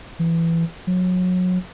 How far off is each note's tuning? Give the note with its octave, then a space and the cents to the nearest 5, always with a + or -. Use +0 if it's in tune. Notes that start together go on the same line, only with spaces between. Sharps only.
E3 +15
F#3 -25